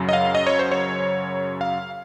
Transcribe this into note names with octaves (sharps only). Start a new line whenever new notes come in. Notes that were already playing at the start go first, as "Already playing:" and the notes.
Already playing: F#2 C#3 F#3
D#5
F5
D#5
C#5
C5
C#5
F5